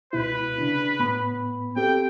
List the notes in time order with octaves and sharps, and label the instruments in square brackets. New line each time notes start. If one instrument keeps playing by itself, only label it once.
[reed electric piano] C#2 B2 E4 [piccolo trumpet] B4
[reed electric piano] C#3 D4
A2 B3 B5
[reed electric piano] C4 G4 A4 [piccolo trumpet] G5